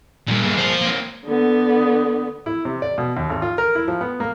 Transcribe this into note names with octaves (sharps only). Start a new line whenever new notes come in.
G2 A#2 D3
A#3 G#4
F4 C5
A#3 C4
D3 B3
E4
C3
D5
B2
D#2
G#1
F4
A#4
E4
F3
B3
A#3